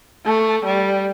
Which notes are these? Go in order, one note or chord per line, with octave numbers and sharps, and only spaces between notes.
A3
G3